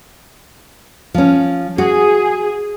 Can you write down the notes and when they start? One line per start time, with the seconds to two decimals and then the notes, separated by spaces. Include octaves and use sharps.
1.14 F3 C#4
1.78 F#4 G#4